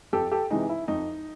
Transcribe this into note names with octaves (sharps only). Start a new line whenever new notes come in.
F2 G4 A4
G4 A4
C3 E3 G#3 D#4
E4
F2 D#4